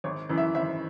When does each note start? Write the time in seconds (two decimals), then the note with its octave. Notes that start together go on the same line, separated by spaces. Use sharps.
0.04 G#1 C#5
0.29 F#2 E3
0.38 E5
0.55 G#1 E5